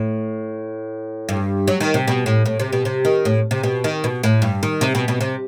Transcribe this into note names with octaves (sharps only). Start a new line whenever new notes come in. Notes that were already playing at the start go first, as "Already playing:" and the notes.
Already playing: A2
G2
F#3
D#3
C3
B2
A2
A2
C3
B2
C3
D#3
A2
C3
B2
D#3
B2
A2
G2
D#3
C3
B2
B2
C3